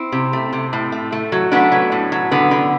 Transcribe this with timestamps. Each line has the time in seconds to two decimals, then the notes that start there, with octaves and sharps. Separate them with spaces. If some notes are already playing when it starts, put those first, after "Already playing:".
Already playing: C4 E4
0.12 C3
0.33 A3
0.53 C3
0.73 A2
0.92 A3
1.12 A3
1.32 F#3
1.52 A3 B3 D4
1.72 F#3
1.92 A2
2.12 F#3
2.31 D3 B3
2.51 D3